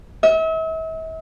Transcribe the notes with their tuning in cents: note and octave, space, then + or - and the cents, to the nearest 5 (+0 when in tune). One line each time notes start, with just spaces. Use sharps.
E5 -40